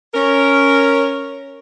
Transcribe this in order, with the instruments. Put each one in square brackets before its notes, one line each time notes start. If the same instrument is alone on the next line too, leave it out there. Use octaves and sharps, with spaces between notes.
[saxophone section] C#4 A#4